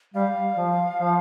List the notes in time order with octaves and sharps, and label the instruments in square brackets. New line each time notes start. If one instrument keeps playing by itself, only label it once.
[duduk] G3 [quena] F5
[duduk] F3
F3